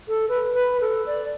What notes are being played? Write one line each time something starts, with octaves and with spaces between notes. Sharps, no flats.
A4
B4
B4
A4
D5